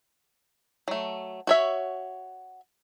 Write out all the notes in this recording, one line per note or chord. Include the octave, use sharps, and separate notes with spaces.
F#3 A3
F#4 C#5 E5